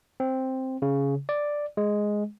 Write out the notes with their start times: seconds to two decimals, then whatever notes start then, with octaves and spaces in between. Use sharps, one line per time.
0.20 C4
0.82 C#3
1.29 D5
1.77 G#3